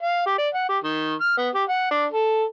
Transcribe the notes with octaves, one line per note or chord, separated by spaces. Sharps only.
F5
G4
D5
F#5
G4
D#3
F6
B3
G4
F#5
D4
A4